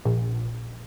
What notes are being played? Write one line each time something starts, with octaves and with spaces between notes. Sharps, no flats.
A#1